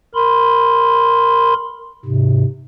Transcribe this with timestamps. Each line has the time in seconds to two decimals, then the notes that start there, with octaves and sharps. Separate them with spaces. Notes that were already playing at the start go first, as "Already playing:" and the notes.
0.15 A#4 B5 C6
2.05 G#2 C3